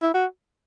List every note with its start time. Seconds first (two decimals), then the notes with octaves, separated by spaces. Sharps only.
0.02 E4
0.14 F#4